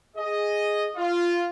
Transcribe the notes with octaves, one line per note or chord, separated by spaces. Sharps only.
G#4 D#5
F4